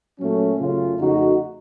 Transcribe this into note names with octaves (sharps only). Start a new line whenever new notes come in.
A#2 F#3 A3 C#4
F#2 C#3 A3 C#4 F4
F2 C#3 A3 D#4 F#4